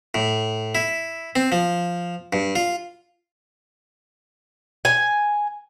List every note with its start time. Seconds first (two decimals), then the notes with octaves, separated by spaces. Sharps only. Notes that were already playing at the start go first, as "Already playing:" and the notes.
0.14 A2
0.75 E4
1.36 C4
1.52 F3
2.33 G2
2.56 F4
4.85 G#5